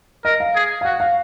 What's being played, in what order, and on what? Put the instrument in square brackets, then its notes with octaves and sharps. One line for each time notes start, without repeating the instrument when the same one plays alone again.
[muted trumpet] A#4 [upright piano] D#5
[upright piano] F5
[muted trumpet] G#4
[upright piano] F5
[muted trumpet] F#4 [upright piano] F#5
[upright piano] F5